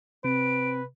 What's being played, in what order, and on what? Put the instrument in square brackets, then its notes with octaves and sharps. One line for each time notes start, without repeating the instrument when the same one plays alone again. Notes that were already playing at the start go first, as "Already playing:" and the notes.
[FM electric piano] C3 [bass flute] C4 [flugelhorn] B4 [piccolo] D7